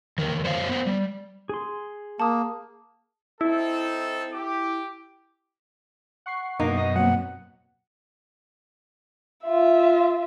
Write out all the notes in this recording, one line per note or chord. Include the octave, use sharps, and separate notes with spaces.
E2 D#3 A#4
F#2 C5 C#5 F5
B3 C5
G3
G#4 C6
A#3 A5 D#6
C4 D#4 E4 A4
G4 D6
F#5 C#6 C7
F#2 B2 A#3 D#4
D#5
F#3 A#3 C4 F#5
F4 E5